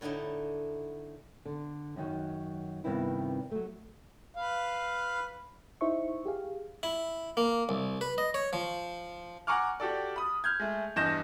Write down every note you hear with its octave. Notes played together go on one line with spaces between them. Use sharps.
A2 D3 A3 D#4 E4
D3
F#2 D#3 F#3
G2 C3 D#3 B3 C4 E4
F#3 A3
B4 F5
D#4 E4 C5 E5 C#6
G4 G#4 F5
E4
A#3
C2
B4
D#5
C#5
F3
F#5 G#5 A#5 C#6 D6 F6
F#4 G4 A4 D5
B5 D#6
F6 G6 G#6
G#3 A3
E2 G2 D#5 G6 A#6 E7